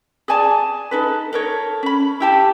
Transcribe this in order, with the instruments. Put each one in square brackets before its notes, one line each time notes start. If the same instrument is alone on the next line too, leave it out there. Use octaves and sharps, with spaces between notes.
[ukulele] G#4 D5 G#5 A5
D#4 A4 B4
A4 A#4 C#5
C#4 B5
E4 G4 A5